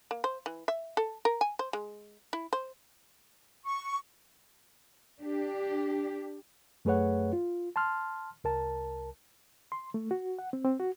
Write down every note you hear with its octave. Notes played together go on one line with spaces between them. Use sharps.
A#3
C5
E3
E5
A4
A#4
G#5
C5
G#3
E4
C5
C#6
D4 G4
F#2 A3 G#4 B4 C#5 F#5
F4
A5 C6 F6
C2 A#4 A5
C6
A3
F#4
F#5
C4
C4
F#4